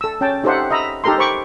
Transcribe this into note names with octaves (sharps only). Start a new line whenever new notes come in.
A4 E6
C#4 G5 A5
D#4 G4 A4 C5 E5 F#5
D#5 E5 A#5 B5
D#4 G4 A4 A#4 A#5 C6
C5 B5 C#6 D6